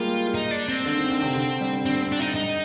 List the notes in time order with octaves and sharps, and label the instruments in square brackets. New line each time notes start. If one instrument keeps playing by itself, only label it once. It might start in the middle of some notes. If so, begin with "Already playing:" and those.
Already playing: [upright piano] G3 G#3 A#3 [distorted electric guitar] F4
[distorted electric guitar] D#4
D4
C4
[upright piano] D3
D#3
D3
C3
D3
G3
[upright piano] D3 [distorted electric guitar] C4
[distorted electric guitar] D4
D#4
D#4